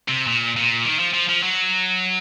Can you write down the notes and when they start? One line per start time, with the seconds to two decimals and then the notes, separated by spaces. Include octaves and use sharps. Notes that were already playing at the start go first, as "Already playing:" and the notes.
0.08 C3
0.27 A#2
0.57 A#2
0.85 D#3
0.99 F3
1.14 F3
1.29 F3
1.43 F#3